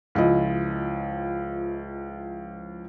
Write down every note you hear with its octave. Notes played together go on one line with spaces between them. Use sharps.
C#2 F3 E4 D#5